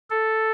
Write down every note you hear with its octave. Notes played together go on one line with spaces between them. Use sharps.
A4